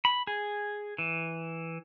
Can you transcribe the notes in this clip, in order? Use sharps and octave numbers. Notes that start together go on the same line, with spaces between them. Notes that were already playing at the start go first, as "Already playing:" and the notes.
B5
G#4
E3